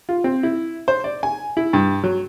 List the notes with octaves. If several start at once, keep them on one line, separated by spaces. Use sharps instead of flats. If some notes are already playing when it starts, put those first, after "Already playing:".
F4
C4
E4
C5
D5
G#5
E4
G2
F#3